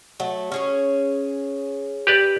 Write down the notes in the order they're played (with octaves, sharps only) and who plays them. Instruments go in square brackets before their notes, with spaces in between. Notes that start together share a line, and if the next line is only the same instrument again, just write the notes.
[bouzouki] F#3 A3
C#4 G#4 C#5
[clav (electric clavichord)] G4 B4 D5